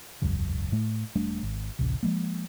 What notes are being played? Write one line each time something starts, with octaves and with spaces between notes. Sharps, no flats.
E1 C#2 F#2 C#3
A2 A3
E1 G3 A3 D4
G#1
A1 D2 C3
F3 G#3 A#3